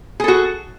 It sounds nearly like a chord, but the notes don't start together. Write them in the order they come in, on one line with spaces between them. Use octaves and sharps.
G#4 A4 F#4